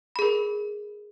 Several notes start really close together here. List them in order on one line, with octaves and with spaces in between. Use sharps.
B5 G#4 A#4